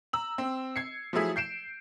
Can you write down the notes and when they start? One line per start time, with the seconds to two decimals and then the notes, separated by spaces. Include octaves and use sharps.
0.13 A#5 E6 F#7
0.38 C4
0.76 G#6 C7 C#7
1.13 F3 F#3 A3 E4 G#4
1.36 G6 C7 D7 E7